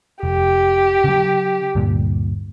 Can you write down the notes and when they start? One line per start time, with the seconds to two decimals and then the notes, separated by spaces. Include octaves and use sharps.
0.23 F1 G4
1.04 C#3 F#3
1.75 D2 G2 A#2